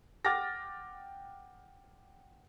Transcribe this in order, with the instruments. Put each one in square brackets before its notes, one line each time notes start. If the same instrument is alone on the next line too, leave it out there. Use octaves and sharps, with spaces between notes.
[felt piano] F#5 G5 D6 F6 A6 A#6